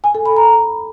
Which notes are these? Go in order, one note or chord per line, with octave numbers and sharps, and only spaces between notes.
G#5
A4
B5
A#5